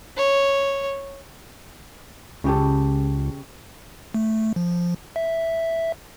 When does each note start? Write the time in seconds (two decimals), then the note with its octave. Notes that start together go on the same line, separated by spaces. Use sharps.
0.17 C#5
2.44 C#2 C#3 G4 A4
4.14 A3
4.56 F3
5.16 E5